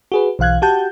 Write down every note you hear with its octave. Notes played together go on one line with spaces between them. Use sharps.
F#4 G#4 B4
B1 E3 F5 F#6 G#6
F#4 G4 F#5 A5 G6